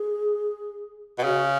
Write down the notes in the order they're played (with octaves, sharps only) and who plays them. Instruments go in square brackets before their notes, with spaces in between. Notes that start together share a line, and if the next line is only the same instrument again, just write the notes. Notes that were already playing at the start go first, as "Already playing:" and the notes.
Already playing: [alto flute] G#4
[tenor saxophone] B2
[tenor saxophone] C#3 [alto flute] F#4